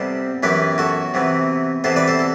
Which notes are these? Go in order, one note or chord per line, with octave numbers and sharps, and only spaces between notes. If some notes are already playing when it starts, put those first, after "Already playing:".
Already playing: C3 G3 B3 A4 C5
F#2 E3 B3 G4 B4
F#4 A4
C3 E3 B3
C3 E3 B3 A4 C5
B4 D5
A4 C5
A4